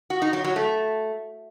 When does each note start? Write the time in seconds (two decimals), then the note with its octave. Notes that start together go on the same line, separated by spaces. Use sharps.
0.10 F#4
0.22 D#4
0.33 F#3
0.44 F#3
0.56 A3